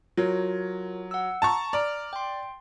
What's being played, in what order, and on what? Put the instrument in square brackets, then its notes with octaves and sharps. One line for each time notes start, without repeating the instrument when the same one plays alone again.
[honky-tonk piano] F#3 [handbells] F4 A#4 C#5
[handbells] F#5 E6
[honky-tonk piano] A5 A#5 C#6
[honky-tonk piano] D5 [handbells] A#5 F6 D7
[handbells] G5 C6